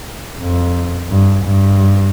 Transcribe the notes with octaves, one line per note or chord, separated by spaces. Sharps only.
F2
G2
G2